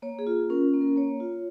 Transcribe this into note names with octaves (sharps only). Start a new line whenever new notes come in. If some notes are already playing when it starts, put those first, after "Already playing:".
A#3 C#5
G#4
F4
C#4 A#4
A#3
A#4
A#3 C#5
F4